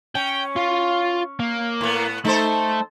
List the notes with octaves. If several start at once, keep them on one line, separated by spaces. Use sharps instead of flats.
C#4 G5
F4
A#3
A2 B3
A3 D#4 A4 C5